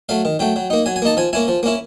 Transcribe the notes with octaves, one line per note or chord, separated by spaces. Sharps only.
F#3 A3 F5
D#3
F#3 A3 G5
F#3
A#3 D#4
F#3 G#5
G#5
A#3 D#4 A5
F3 G#5
A#3 C#4 E4 G#5
F3
A#3 C#4 E4